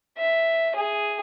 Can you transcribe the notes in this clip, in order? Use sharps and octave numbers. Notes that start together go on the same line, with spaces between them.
E5
G#4